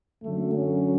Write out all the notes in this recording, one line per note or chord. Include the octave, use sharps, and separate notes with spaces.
F#2 D3 F#3 A3
C#4